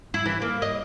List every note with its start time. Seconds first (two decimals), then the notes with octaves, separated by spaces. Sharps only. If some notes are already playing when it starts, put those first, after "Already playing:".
0.14 E4
0.26 E3
0.42 A#3
0.62 D#5